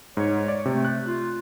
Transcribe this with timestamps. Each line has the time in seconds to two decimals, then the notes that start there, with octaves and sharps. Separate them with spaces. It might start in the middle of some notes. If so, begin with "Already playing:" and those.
0.17 G#2 C#5
0.48 D5
0.65 C3 A3
0.85 F#6
1.06 F4